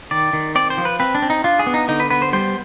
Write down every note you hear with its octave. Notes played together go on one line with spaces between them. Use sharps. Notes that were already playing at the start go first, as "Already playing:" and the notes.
D#3 D5
D#3
C4 D5
C5
F3
B4
C4 B4
D4
C4
D#4
D4 F4
G#4
B3
D#4
D3 D#4
B4
B3 B4
C5
G3 C5